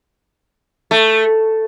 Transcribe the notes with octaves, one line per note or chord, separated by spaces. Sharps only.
A3